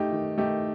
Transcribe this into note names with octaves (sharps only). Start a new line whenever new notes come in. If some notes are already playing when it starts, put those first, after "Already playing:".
Already playing: A3 D#4 G4
D#3
A3 D#4 G4